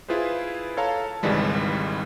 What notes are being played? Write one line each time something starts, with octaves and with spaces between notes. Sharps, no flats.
E4 F4 G#4 B4 C5
A4 C#5 F5 A5 A#5
G#1 C#2 D#3 E3 G3 G#3